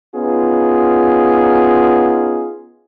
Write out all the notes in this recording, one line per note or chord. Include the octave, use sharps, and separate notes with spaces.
B3 C#4 D#4 F4 G#4